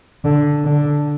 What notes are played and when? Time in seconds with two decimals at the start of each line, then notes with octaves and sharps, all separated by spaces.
0.24 D3
0.64 D3